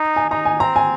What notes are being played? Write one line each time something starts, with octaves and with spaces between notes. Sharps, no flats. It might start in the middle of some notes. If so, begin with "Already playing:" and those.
Already playing: D#4
G#5
D#4 A#5
G#5
C4 A#5
G#5